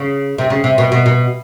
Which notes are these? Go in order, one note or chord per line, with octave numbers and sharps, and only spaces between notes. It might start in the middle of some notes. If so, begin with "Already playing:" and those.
Already playing: C#3
C3
C#3
C3
B2
B2
B2